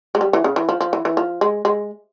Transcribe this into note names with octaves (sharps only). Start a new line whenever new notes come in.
G#3
G3
E3
C#3
E3
F3
F3
E3
E3
F3
G#3
G#3